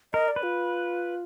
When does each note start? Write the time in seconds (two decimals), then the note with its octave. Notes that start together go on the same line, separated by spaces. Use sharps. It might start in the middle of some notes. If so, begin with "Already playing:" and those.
0.13 A#4 D#5
0.28 D5
0.36 B4
0.43 F4